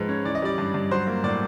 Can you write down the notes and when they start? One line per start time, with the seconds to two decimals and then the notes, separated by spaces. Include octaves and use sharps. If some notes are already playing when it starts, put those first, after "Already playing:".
Already playing: G#2 F3 G#3 B4
0.09 C#4
0.25 E3 D5
0.35 D#5
0.42 G3 D5
0.58 G2
0.74 G2
0.91 F#3 C5
1.07 A#3
1.23 A2 D5